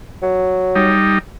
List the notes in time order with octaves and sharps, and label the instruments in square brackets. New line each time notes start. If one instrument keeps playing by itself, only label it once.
[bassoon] F#3
[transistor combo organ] G3 D#4